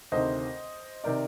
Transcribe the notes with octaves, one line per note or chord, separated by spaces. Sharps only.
D2 C3 D#3 C5 D#5
C3 D#3 A#4 D5